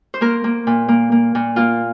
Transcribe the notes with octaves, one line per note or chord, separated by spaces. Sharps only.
C5
A#3 A#4
A#3
A#2
A#3
A#3
A#2
A#3 F4